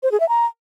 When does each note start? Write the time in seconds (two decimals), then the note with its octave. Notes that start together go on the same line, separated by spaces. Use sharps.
0.03 C5
0.12 G#4
0.20 E5
0.29 A#5